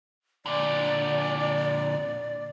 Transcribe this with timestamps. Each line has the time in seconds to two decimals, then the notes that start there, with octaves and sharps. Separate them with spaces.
0.46 A#2 D3 D5